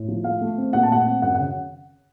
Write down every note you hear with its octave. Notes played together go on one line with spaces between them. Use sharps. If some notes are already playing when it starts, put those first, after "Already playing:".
Already playing: A2
F3
A3 F5
A3
C4
A#2 F#5
A5
A3 F#5
C4
F#2 F#5
C#3 F#5